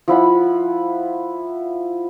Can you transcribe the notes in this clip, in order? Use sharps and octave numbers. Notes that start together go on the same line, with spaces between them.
F3 E4 F#5 B5